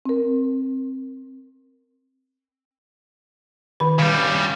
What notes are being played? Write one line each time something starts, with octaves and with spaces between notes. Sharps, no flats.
C4 A#4
D#3 B4
C#3 G3